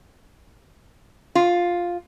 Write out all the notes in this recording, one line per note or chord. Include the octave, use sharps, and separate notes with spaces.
F4